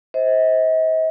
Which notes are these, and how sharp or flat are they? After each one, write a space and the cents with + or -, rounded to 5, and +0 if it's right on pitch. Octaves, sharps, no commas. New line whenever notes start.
C5 +0 D#5 +45